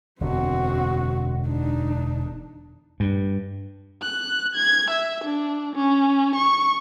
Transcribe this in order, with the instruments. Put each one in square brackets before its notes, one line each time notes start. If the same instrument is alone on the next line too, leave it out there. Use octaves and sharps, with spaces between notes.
[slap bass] E1 F#2 D3 [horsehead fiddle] C4 F#4
[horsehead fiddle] D4 D#4
[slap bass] G2
[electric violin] F#6
G#6
E5
D4
C#4
C#6